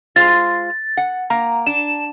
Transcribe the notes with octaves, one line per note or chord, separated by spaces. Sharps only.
G#3 F4 C5 A6
F#5
A#3 A#5
D4 E7